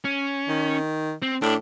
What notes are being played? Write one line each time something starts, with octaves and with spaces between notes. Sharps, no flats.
C#4
D#3
C4
A2 D4